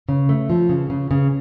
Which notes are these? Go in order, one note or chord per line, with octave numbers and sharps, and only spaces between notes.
C#3
A3
F3
C#3
C#3
C#3